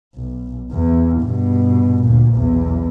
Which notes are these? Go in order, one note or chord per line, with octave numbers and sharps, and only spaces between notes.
B1
E2
G2 B2
D2 A#2
B1 E2